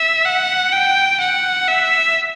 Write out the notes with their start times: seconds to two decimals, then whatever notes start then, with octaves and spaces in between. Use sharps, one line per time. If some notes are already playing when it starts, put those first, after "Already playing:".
Already playing: E5
0.25 F#5
0.72 G5
1.20 F#5
1.68 E5